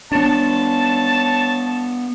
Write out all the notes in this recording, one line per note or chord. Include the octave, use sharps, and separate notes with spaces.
B3 D4 C#5 A5